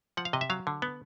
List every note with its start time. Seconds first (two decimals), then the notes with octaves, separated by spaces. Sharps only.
0.17 F3 F#5
0.25 F5
0.33 C3 D#5
0.41 E5
0.50 F#3 F5
0.67 D3
0.82 B3